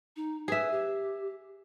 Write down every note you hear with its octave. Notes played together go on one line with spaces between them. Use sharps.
D#4
G#4 B4 E5
G4